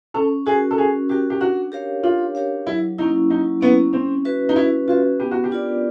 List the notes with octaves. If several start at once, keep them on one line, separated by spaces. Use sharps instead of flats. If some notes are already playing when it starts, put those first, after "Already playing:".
C#4 A4
F#4 G#4 A#4
A4
C#4 G#4
F#4 G4 A#4
G4
D4 F#4
G4 A#4 C#5 F5
D4 F4
G4 A#4 C#5 F5
F#3 E4
A#3 C#4 D#4 E4
F#3 D#4
A#3 B3 C#4 E4
C4 C#4
F#4 B4 E5
D#4
C#4 E4
F4 F#4 B4 E5
B3 G4
F#4
G4
D4 F4 A#4 D5